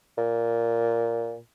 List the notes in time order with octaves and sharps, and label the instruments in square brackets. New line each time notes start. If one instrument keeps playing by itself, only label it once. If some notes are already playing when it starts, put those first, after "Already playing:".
[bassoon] A#2